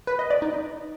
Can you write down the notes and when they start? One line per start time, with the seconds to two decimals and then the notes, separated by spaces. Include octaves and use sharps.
0.07 B4
0.19 D#5
0.30 D5
0.42 D#4